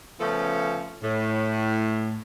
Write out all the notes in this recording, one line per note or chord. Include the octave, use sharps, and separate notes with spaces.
C#3 F3 A3 B3 C#4 A4
A2